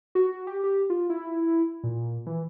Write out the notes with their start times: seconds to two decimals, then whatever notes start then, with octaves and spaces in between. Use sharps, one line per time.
0.15 F#4
0.47 G4
0.64 G4
0.90 F4
1.10 E4
1.84 A#2
2.26 E3